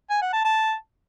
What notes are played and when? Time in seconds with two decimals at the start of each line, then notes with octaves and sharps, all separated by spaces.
0.10 G#5
0.22 F#5
0.33 A5
0.44 A5